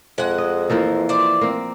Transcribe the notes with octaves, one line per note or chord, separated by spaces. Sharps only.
F2 G#3 F#5
D#5
E3 F3 A#3
C5 D5
A#3 C4